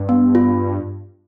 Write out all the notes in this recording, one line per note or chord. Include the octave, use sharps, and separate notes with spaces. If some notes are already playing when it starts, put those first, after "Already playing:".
Already playing: G2
B3
F4